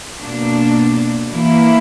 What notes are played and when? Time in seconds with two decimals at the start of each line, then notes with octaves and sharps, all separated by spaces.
0.20 B2 A#3 D4
1.32 E3 A#3 E4